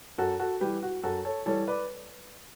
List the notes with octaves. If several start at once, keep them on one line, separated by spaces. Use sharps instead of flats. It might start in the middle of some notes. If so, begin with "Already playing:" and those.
F#2 F#4 A4
F#4 A4
E3 G3 G4 B4
F#4
F#2 F#4 A4
A4 C#5
E3 G3 A4 C#5
B4 D5